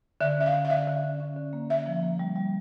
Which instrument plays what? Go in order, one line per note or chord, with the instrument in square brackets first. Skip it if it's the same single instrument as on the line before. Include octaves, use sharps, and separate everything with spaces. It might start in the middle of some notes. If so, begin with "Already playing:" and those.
[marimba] D3 [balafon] E5
[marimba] C#4 [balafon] E5
[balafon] F5
[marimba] D3
[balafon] F5
[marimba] D3 [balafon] E5
[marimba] D3
C#4
C#4
D3
A#3
[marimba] D3 [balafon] E5
[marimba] F3
A#3
G3
G3